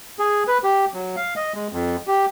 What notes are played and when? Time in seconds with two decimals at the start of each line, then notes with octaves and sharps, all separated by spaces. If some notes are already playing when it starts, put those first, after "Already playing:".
0.19 G#4
0.48 B4
0.64 G4
0.94 F#3
1.16 F5
1.36 D#5
1.54 G#3
1.73 F2
2.07 G4